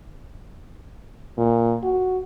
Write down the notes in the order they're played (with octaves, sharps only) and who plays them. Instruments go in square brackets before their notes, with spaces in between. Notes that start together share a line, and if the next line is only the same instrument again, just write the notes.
[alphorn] A#2
F#4